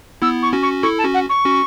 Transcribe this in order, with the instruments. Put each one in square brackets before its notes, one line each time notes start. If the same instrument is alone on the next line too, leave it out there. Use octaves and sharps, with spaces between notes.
[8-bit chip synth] B3 E4 [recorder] E6
[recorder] C#6
[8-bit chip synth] C#4 F#4
[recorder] C#6
[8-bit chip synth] E4 A4 [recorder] C#6
[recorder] A5
[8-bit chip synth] C#4 F#4
[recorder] F#5
C#6
[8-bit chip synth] C#4 F#4